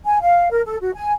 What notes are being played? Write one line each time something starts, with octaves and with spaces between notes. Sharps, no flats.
G#5
F5
A#4
A4
F#4
G#5